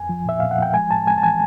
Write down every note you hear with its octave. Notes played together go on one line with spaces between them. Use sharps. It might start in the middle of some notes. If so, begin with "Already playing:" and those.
Already playing: F2 G#5
F3
A#2 E5
A#2 F5
F#5
F3 G5
G#3 G#5
A2 A5
G#3 G#5
A5
E3 G#5